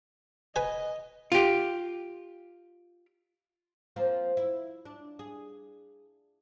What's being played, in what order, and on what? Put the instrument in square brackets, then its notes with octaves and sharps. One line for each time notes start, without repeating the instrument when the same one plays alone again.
[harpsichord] B4 G#5 [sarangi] D#5
[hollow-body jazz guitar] F4 G4
[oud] F3 A#3 C4
E4
D4
G#4